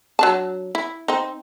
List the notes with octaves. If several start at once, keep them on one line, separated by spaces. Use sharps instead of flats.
F#3 D4 A5
E4
C4 D#4